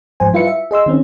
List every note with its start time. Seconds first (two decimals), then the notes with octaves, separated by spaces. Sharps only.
0.20 G#2 F3 C5 G#5
0.33 G3 E4 F4 B4 E5 C#7
0.47 E5
0.71 G#4 D#5 C6 E6
0.86 D#3 C4 C#4